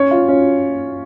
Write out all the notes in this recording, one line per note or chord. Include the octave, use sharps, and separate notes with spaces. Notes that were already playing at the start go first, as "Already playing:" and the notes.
Already playing: C#4 C#5
F4
C#4